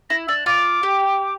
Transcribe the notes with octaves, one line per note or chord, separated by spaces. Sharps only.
E4 A#6
D4 E6
F4 D6
G4